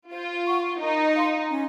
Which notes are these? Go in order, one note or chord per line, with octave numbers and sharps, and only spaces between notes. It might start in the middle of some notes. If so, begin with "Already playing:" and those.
F4 C5
F#5 C#6
D#4 A#4
F5 C6
C#4